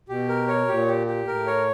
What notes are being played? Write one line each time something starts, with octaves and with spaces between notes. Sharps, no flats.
B2 G4
A#4
C#5
A#2 G4
G4
G4
A2 A#4
C#5